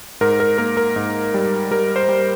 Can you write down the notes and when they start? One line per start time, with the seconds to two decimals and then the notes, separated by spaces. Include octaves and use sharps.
0.21 G#2 A#4
0.40 A#4
0.58 A#3 A#4
0.77 A#4
0.96 G#2
1.34 G3
1.71 G3 A#4
1.96 C5
2.09 G3